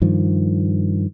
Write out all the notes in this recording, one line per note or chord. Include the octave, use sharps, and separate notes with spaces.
G2 D#3 F3